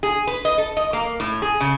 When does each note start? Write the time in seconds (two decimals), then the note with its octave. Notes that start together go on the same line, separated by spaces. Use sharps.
0.03 G#4
0.27 B4
0.45 D#5
0.58 A4
0.77 D#5
0.93 A#3
1.20 A2
1.42 G#4
1.60 C#3